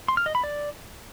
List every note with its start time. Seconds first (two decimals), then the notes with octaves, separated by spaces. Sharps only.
0.08 C6
0.17 F6
0.26 D#5
0.35 B5
0.44 D5